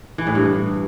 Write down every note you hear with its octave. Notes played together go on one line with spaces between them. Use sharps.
E3
A2
G2